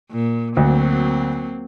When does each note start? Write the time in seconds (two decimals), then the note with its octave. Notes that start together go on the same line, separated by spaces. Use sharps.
0.11 A#2
0.57 D2 F#3 A#3 C4